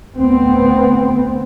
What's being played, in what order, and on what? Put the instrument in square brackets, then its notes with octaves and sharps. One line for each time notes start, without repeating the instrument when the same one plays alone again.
[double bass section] D2 B3 C4